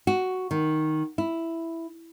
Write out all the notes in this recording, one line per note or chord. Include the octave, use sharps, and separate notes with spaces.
F#4
D#3
E4